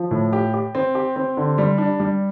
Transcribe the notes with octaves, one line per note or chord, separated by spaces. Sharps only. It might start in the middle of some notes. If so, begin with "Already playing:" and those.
Already playing: F3
A2
G4
G4
C4
G4
C4
D3
G3
D4
G3